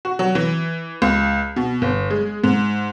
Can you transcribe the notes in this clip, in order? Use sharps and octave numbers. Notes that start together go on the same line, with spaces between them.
F#4
F#3
E3
C#2
B2
G1
G#3
G#2